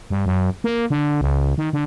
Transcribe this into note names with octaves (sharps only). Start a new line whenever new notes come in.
G2
F#2
A#3
D3
C#2
D#3
D3